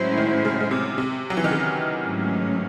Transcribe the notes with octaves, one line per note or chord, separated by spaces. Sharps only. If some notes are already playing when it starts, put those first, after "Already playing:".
Already playing: A2 F#3 G#3 C#4 E4 C5
D#3
C#3
C#3
C3
C3
F#3
E3
D#3
C#3
G#2 F#3 A3 C#4